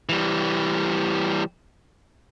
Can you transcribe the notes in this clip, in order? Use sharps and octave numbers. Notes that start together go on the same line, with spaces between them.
E3 G3